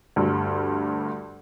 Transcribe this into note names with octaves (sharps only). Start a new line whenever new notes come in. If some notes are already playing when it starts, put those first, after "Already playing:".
D2 G2